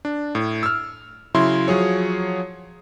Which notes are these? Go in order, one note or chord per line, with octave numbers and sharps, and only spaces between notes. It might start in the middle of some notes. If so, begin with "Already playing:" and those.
D4
A2
E6 F6
C#3 F#3 E4 C6
F3 F#3 G#4 C#5